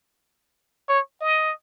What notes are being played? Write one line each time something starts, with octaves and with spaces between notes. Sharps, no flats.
C#5
D#5